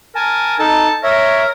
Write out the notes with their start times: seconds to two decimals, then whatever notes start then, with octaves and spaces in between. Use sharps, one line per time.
0.15 A#4 G#5 A5
0.59 D#4 A4 A5
1.03 A#4 C#5 E5